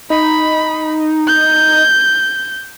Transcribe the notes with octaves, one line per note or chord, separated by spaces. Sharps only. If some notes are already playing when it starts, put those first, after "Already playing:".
D#4 B5
G6